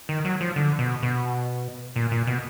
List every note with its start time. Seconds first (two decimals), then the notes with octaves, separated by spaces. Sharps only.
0.09 D#3
0.25 F#3
0.41 F3
0.56 D3
0.79 B2
1.03 B2
1.96 A#2
2.11 A#2
2.27 B2